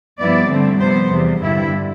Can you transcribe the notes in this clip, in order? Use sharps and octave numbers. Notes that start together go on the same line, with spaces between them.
G2 F3 B3 E4 D5
G2 D3 A3 C4
C3 F3 B3 C5
E2 C3 G3
G2 D3 G3 E4